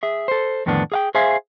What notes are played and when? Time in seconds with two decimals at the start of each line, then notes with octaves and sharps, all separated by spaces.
0.03 G#4 E5
0.28 A4 C5
0.66 F2 A2 D3 D#3 B3 D4
0.92 G#4 F5 G5
1.15 G#4 C5 E5 F5 G#5